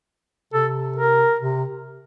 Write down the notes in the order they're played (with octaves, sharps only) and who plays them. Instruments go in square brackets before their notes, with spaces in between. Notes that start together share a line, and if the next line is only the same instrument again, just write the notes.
[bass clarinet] C3 [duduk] A4
[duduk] A#4
[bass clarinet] C3